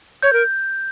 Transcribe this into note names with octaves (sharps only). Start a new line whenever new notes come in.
C#5 G6
A#4